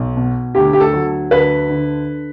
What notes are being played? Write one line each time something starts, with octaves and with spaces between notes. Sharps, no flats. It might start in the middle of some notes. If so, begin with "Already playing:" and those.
Already playing: B1
B2
D2 G4
G4
A4
F#3
D2 B4
D3